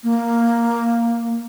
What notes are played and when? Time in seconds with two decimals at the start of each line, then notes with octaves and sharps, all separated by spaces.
0.04 A#3